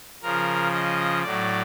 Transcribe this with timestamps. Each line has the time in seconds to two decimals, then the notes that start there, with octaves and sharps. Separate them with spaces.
0.23 C#3 F3 A#4
0.73 D#5
1.23 A2 F#3 D5